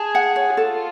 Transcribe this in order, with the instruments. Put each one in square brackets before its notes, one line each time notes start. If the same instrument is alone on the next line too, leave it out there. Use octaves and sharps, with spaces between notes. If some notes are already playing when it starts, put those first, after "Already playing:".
Already playing: [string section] G#4 [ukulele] A5
[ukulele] F#5
C#5
[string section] F4 [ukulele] A4